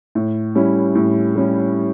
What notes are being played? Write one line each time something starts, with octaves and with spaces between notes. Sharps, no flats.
A2
G3 C#4 E4
A2
G3 C#4 E4